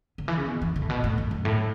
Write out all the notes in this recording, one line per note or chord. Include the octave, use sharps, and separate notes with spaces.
C#3
E3
C#3
B2
E3
C#3
A2
B2
A2
F#2
F#2
A2